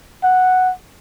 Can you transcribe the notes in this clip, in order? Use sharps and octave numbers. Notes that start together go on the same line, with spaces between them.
F#5